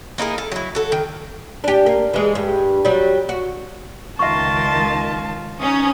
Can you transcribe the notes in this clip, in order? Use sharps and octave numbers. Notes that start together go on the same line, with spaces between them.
A#3 D#4 E4 G#4
A4
F#3 E4
F#4 A4
D#3
D4 G4
A#3
E3 G#3
G2
F#3 G3
F#4
C#2 D#3 F4 E5 A5 C6 C#6
C#4 D#4 D#5 D#6